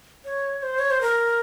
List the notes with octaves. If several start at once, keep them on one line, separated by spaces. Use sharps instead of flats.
C#5
C5
C#5
C5
A#4